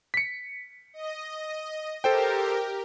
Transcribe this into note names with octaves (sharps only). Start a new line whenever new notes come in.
B6 C#7
D#5
G4 A4 A#4 C5 G5